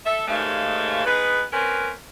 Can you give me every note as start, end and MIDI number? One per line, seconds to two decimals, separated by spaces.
0.05 0.23 69
0.05 0.23 76
0.28 1.04 39
0.28 1.04 44
0.28 1.04 49
0.28 1.04 56
0.28 1.04 57
0.28 1.04 77
1.06 1.42 56
1.06 1.42 59
1.06 1.42 63
1.06 1.42 71
1.52 1.91 58
1.52 1.91 60
1.52 1.91 61
1.52 1.91 70
1.52 1.91 71